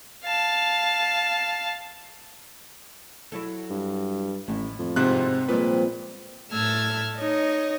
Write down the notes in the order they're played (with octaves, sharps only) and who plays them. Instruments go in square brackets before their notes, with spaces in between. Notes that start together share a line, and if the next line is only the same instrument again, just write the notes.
[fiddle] F5 A5
[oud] F#3 E4 A4
[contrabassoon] G2
[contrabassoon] A1 [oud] D#2 A2
[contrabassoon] F2
[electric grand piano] G#2 C3 F#6 [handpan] C4
[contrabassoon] A#2 [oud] F3 G3 G#3 [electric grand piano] B4
[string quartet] A2 A3 A5 E6 F6 G#6
D#4 C#5 D#5